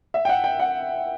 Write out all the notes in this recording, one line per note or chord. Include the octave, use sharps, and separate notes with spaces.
E5
G5
F#5
G5
F#5